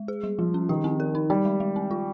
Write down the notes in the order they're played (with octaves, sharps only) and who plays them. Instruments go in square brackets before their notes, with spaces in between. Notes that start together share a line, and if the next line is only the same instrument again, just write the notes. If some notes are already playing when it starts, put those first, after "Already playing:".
Already playing: [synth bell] G#3
G#4
G3
[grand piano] F3 [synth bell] G3
[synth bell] C#4
[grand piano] D#3 [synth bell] G4
[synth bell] C4
A#4
D#4
[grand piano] G3 [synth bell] D#4
[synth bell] G#3
G#3
C4
F4